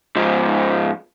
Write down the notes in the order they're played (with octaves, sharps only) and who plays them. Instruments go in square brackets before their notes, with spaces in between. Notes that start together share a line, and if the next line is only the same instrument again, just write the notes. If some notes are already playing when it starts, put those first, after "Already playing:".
[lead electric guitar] G#2 F3